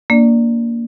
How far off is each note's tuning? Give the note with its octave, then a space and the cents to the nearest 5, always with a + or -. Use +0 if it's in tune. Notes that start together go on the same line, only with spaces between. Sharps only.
A#3 +0 D4 -20 D5 +0